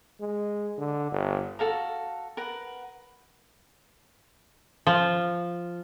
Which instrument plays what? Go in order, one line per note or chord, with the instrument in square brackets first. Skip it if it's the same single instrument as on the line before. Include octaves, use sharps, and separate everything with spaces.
[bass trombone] G#3
D3
G1
[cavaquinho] F#4 A4 F5 A#5
A#4 B4 F#5
[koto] F3